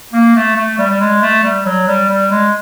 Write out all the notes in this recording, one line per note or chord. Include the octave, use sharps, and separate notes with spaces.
A#3
A3
A3
G3
G3
G#3
A3
G3
F#3
G3
G3
G#3